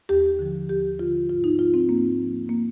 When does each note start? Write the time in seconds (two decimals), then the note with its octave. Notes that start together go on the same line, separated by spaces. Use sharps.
0.09 D#2 G4
0.39 D3 F3
0.69 D#2 G4
0.99 D3 F3 F4
1.29 G#2 F4
1.44 D#4
1.59 F3 F4
1.74 C4
1.89 G#2 A#3
2.19 F3
2.49 A#3